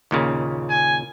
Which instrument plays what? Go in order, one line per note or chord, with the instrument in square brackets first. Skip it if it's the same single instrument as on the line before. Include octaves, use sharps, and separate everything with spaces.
[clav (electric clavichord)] D#2 A#2 C#3
[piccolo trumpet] G#5